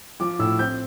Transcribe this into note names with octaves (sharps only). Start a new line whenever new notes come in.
F3 D6
A2 E6
C4 G6